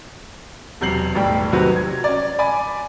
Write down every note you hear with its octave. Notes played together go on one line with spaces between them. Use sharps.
E1 C3 F#3 G6 C7 F#7
E1 B1 A2 G3 G5
C3 D#3 F#3 C4 F#4 B4
G#6
C#4 D5
D5 G#5 B5 D6